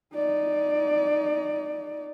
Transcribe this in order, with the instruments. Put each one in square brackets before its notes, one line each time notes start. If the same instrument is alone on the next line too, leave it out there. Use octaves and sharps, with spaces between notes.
[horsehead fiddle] D#4 D5